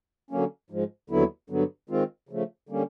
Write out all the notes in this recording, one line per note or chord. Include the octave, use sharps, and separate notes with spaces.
D3 F#3 A#3 C#4
G#2 F3 G#3
D#2 D3 F#3 B3 E4
G2 D3 F#3 B3
D#3 G#3 C4 F4
C#3 F3 A3
D3 G3 A#3 C#4